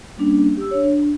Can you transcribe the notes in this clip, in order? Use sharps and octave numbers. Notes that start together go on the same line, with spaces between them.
G3 A#3 C#4 D4
G4 E6
D4 C#5
D4